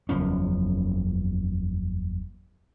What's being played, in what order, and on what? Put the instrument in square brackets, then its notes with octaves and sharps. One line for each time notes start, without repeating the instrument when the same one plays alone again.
[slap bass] F#1 E2 F3 C#4